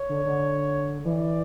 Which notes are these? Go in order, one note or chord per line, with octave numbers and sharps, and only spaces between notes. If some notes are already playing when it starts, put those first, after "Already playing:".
Already playing: C#5
D3
D3
E3 D5